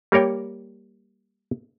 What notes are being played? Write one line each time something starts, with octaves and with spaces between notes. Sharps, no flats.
G3 A#3 A#4 C#5 G5